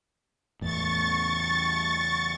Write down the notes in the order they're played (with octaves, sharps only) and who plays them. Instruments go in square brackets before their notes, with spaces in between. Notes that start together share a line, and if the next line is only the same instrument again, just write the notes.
[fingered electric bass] E2 A2 [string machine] C#6 A6